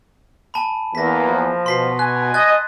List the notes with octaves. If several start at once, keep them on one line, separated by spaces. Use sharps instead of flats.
G#5 A5 B5
E2 E3 A#3 A#6 B6
F3
B2 C6 B6 C7
G#5 F#6
D#5 F#6 G#6 A6